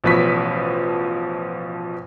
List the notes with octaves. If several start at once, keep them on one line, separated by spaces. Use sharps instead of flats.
A1 B2 F3 B4 C#6 B6